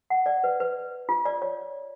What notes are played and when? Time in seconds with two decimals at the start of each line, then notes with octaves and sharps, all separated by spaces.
0.10 F#5
0.26 D5
0.44 B4
0.60 B4
1.09 F4
1.25 D5
1.42 C#5